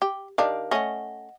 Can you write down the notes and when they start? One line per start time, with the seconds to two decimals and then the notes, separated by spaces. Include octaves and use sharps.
0.02 G4
0.38 D#3 D4 G4 A#4 F5
0.71 A3 C#4 D#5 F#5